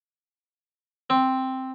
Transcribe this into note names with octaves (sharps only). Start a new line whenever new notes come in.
C4